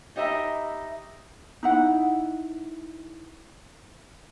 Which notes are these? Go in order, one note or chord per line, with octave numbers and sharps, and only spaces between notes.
D#4 G4 D#5 E5 A#5 B5
D#4 E4 F#5